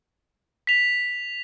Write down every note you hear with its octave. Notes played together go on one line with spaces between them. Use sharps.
B6 F7